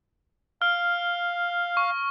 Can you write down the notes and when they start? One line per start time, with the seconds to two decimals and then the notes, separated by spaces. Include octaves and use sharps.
0.62 F5 F6
1.77 C#6